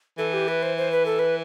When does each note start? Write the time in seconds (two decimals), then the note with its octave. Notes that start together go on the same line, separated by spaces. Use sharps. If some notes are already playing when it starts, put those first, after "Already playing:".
0.18 E3 A4
0.33 G4
0.48 B4
0.63 C5
0.78 C5
0.92 B4
1.06 A4
1.19 B4